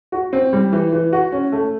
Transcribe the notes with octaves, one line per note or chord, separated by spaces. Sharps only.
F#4
C4
G3
E3
E3
F#4
C#4
A3